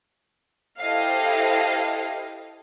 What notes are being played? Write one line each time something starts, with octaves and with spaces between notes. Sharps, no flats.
E4 G4 A4 C5 D#5 F5